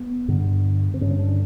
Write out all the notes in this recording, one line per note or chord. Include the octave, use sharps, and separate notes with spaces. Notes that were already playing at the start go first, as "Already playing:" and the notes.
Already playing: B3
G2 D3
C4
G2 D3 C#4
D4